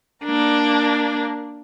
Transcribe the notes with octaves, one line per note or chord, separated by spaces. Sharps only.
A#3 D4 A#4